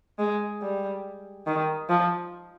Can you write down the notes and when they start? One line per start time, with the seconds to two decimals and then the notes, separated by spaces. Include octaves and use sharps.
0.19 G#3
0.62 G3
1.47 D#3
1.90 F3